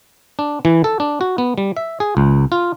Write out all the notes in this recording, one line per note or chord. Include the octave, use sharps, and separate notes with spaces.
D4
E3
A4
D4
F#4
B3
G3
E5
G#4
C#2
F4